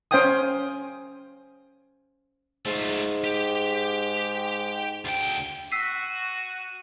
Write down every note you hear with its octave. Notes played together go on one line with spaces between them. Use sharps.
C#4 C5 F5 G5 G#5 D#6
G#2 A3 F4
G4
D2 G5
F#4 E6 B6 C7 D#7